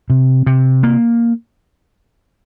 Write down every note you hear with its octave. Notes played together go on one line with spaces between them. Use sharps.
C3
C3
A#3